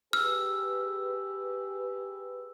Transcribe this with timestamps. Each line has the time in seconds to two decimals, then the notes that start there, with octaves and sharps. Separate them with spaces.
0.13 G4 G#4 B4 E6 F6